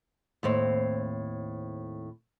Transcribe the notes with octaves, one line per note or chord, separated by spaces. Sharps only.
D#2 A2 C4